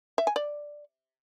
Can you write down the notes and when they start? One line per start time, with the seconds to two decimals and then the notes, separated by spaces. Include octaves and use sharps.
0.18 E5
0.27 G#5
0.36 D5